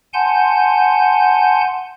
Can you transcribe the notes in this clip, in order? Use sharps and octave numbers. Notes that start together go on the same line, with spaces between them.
F#5 G#5 A5 C6 G6